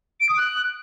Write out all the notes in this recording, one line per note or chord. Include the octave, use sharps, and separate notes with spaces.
D7
D#6
F#6